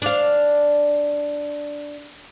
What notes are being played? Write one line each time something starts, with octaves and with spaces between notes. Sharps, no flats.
D4 F5